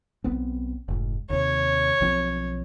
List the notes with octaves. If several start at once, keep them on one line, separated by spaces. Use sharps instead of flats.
B1 B3 C4
F1 G#2
D#2 C3 C#5
B1 F3 C4